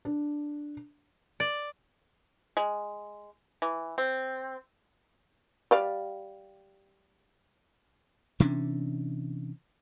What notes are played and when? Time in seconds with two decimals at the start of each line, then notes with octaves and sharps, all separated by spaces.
0.05 D4
1.40 D5
2.57 G#3
3.62 E3
3.98 C4
5.71 G3 D5 F5
8.40 C3 E3 C#4 D4